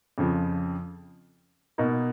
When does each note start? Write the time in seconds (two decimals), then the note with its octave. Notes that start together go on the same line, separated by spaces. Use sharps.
0.18 F2 C#3 F3
1.78 B2 A#3 D#4